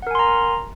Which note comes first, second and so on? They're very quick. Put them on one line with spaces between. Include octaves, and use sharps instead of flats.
F#5 A#4 G#5 C6 A#5